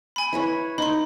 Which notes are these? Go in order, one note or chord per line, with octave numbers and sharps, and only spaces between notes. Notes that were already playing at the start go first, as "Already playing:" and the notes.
G#5 B5
E4 B4 C#5
D#4 B5 C6